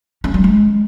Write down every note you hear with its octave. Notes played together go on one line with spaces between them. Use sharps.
C#4
G3
G#3